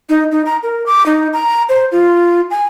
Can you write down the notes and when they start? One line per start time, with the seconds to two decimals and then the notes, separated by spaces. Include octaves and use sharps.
0.09 D#4
0.31 D#4
0.46 A#5
0.63 A#4
0.86 D6
1.06 D#4
1.33 A#5
1.69 C5
1.92 F4
2.51 G#5